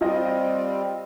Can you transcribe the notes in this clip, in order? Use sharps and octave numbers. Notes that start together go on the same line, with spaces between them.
G3 C4 F4 D#5